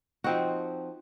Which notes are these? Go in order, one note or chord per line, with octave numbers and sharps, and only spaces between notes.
F3 C4 D#4 F#4